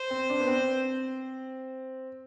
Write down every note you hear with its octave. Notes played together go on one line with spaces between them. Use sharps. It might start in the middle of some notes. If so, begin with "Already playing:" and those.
Already playing: C5
C4
D4
B3
C4